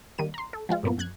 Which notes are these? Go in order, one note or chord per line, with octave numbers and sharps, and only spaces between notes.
D#3 G3 A#3 D#7
A#5 C6
A4
F3 G#3 F4
G2 A#2 F3 A#3 B3
F#2 F#6 G#6